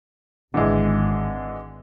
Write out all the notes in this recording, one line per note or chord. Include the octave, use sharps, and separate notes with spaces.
G#1 D3 E3 G#3